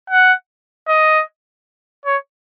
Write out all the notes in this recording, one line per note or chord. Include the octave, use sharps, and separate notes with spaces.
F#5
D#5
C#5